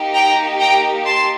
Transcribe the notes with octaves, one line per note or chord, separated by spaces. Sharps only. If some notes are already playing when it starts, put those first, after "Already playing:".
Already playing: A#3 D#4 G4
G5 A#5
G5 A#5
A5 C6